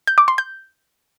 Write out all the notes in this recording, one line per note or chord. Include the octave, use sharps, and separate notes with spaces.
G6
D6
C6
G6